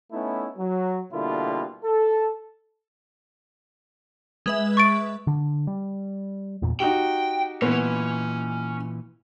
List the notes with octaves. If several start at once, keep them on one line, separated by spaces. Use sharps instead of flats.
A3 B3 C#4 D#4 E4
F#3
B2 D3 G3 A#3 E4 F4
A4
G#3 B4 E5
C#6 A6 D7
D3
G3
E2 A#2
D#4 F#4 G4 G5
A#2 E3 B3 C#4